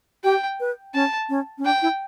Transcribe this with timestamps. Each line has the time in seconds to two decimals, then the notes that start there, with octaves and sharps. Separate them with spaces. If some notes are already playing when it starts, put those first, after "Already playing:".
0.24 G4 G5
0.60 B4
0.94 C#4 A5
1.29 C#4
1.58 C#4
1.65 D4 G5
1.82 E4